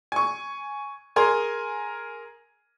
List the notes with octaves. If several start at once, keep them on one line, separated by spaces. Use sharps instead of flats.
G#5 C#6
G#4 A#4 G#5 A#5 C6